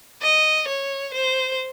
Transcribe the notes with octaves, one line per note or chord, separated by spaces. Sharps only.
D#5
C#5
C5